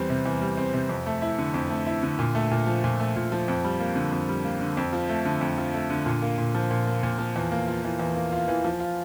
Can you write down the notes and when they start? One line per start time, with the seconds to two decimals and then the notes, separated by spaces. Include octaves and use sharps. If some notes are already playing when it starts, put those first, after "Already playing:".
Already playing: E2 G3 C4
0.10 C3
0.26 E2
0.41 G3
0.57 C4
0.74 C3
0.89 F2
1.06 A3
1.22 E4
1.38 D3
1.54 F2
1.70 A3
1.87 E4
2.03 D3
2.19 A#2
2.35 A3
2.51 A#2
2.67 F3
2.84 A#2
2.99 A3
3.16 A#2
3.32 F3
3.48 F2
3.64 G3
3.80 A#3
3.96 D3
4.12 F2
4.29 G3
4.45 A#3
4.61 D3
4.77 F2
4.93 F3
5.09 A3
5.25 D3
5.41 F2
5.58 F3
5.74 A3
5.90 D3
6.06 A#2
6.22 A#3
6.38 A#2
6.55 F3
6.71 A#2
6.87 A#3
7.03 A#2
7.18 F3
7.36 E2
7.52 A#3
7.68 F4
7.84 E3
7.99 E2
8.16 A#3
8.32 F4
8.48 E3
8.64 F3
8.80 F4